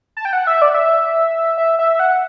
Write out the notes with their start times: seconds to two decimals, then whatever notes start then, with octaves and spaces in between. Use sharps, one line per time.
0.17 A5
0.25 G5
0.33 F#5
0.47 E5
0.62 D5
0.74 E5
1.58 E5
1.79 E5
1.99 F#5